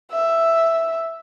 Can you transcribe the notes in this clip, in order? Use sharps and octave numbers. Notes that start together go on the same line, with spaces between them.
E5